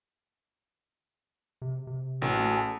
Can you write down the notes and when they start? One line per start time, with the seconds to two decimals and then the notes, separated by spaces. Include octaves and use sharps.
1.62 C3
1.87 C3
2.22 A1 F#4 G#4 A4
2.40 A3